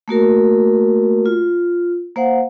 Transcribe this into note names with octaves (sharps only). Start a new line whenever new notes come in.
A3 A#3 F#4 A#4
F4
A#3 C5 F5 F#5